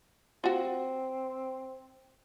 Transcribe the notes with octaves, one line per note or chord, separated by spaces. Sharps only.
C4 F4 F#4